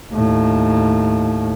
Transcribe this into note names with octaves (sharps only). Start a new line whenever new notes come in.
D#2 A2